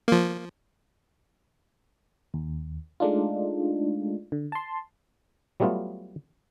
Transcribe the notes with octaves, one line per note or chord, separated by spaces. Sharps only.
F3 A#3
D#2
G#3 A3 D4 D#4 F4
D3
A5 C6
F#3 G3 A3 B3 F4